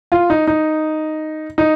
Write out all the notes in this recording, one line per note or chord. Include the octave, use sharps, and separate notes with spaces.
F4
D#4
D#4
D#4